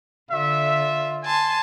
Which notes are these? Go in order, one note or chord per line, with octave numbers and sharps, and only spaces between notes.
D3 F4 E5
G#5 A5 C6